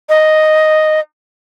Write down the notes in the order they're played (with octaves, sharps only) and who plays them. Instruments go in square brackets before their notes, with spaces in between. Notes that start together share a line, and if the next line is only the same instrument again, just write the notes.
[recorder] D#5